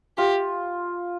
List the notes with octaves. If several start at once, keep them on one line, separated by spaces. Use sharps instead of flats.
F4 G4